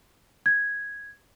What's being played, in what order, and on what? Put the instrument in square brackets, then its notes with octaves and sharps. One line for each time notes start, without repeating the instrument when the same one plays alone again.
[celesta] G#6